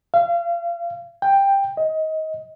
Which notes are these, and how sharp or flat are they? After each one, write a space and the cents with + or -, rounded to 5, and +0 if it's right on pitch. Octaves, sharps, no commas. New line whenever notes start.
F5 -35
G5 +10
D#5 +20